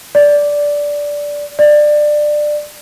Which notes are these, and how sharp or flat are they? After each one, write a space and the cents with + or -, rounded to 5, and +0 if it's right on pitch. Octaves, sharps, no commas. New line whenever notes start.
D5 -10
D5 +20